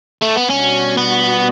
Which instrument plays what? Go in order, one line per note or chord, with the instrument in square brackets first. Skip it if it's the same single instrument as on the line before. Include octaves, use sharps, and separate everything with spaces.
[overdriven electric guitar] A3
B3
[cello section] B2 G3 D4 F#4 [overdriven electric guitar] C#4
[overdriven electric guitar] B3